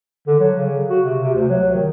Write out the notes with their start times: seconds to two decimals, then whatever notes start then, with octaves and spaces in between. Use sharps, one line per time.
0.27 D3
0.40 F#3
0.56 C#3
0.90 F#4
1.05 C3
1.22 C3
1.34 D2
1.49 F#3
1.74 D#3